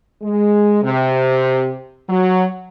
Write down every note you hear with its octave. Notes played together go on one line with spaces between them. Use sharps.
G#3
C3
F#3